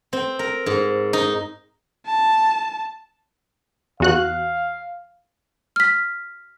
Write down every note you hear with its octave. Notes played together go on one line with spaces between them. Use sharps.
C4
A#4
G#2
D#4
A5
E2 F#4 F5 F#6
F6 B6